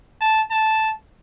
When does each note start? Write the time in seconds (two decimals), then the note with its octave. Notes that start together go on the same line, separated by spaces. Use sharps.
0.21 A5
0.50 A5